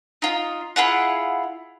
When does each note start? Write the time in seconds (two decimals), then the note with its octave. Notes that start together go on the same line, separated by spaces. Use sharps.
0.22 D#4 F4
0.76 E4 F4 G#4 F#5